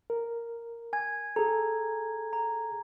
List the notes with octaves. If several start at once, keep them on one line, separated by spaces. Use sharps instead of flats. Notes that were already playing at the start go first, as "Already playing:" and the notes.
A#4
G#5 G#6
G#4 A4 A#5
A#5